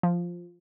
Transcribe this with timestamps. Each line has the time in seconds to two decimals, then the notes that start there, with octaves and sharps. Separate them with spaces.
0.03 F3